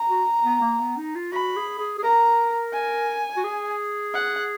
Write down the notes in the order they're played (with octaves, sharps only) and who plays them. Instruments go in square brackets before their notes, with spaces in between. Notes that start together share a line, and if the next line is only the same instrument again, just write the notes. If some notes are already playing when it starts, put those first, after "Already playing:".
Already playing: [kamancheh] A#5
[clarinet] F#4
B3
A#3
B3
D#4
F4
[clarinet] F#4 [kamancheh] B5
[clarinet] G#4
G#4
G#4
[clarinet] A#4 [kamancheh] A#5
[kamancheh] G#5
[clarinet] F#4
G#4
[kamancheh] F#5